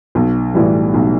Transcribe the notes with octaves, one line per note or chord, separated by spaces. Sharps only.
B1
A2 E3 G3
B1